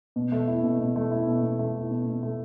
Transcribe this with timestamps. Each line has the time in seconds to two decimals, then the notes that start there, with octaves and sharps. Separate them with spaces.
0.16 B2
0.32 A3
0.48 E4
0.63 B2
0.80 B2
0.96 A3
1.11 E4
1.27 B2
1.43 B2
1.59 A3
1.75 E4
1.91 B2
2.07 B2
2.23 A3